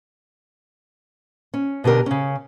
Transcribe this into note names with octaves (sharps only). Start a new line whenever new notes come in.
C#4
B2 D3 G4 A#4
C#3 C#4